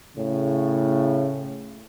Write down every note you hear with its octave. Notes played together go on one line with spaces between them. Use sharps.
A2 C#3